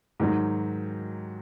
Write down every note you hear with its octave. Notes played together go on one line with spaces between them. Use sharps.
G#2 D#3 F#3